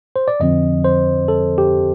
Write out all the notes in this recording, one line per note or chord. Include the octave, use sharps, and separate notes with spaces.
C5
D5
F2 D3 F3 C4 D#5
C5
A4
G4